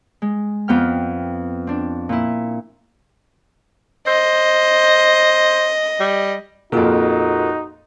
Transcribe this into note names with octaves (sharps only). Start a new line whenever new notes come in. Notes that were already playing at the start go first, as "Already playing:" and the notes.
G#3
F2 B3 G5 F6
C4 D4
A#2 E4
C5 D#5
G3
F2 A#2 D#4 F4 F#4 G#4 A#4